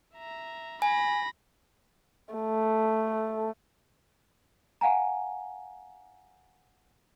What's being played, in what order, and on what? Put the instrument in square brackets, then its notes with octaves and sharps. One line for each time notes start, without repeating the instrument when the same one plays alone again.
[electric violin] E5 A#5
[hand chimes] G#5 [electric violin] B5 A#6
[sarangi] A3
[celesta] F5 F#5 G#5 A#5